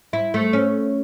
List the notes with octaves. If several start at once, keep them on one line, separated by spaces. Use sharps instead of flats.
E4
A3
C#4